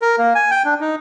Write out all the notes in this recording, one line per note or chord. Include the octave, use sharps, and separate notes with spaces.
A#4
A#3
G#5
G5
D4
D#4